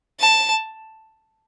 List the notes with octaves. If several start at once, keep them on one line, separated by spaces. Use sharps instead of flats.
A5